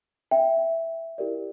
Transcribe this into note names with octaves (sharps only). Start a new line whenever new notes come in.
E5 G5
E4 G4 A#4 D5